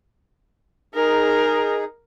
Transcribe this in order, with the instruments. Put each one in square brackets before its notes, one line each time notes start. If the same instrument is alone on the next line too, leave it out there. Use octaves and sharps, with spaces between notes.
[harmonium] D#4 G#4 [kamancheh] A#4